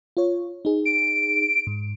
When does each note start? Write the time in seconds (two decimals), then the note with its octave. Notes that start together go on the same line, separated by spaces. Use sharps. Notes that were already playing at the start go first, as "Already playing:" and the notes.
0.17 F4 C#5
0.65 D#4 G#4
0.85 D7
1.67 G#2